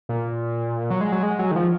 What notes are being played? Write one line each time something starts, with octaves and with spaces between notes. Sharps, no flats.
A#2
F#3
G#3
F#3
G#3
F#3
D#3
F3